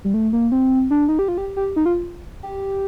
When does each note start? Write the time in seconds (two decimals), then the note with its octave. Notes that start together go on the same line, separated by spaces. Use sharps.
0.04 G3
0.14 A3
0.33 A#3
0.52 C4
0.91 D4
1.09 D#4
1.19 G4
1.28 F4
1.38 G4
1.57 G4
1.76 D#4
1.86 F4
2.43 G4